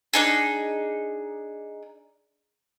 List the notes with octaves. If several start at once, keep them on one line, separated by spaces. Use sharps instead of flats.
D4 D#4 G#4